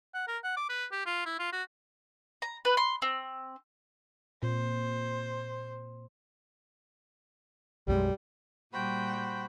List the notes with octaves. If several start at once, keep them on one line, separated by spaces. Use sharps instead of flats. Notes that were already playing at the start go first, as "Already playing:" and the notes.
F#5
A#4
F#5
D6
B4
G4
F4
E4
F4
F#4
A#5
B4
C6
C4
A#2 C4 C5
B1 F#2 G3 G#3
A#2 G3 F#4 C5 G5 B5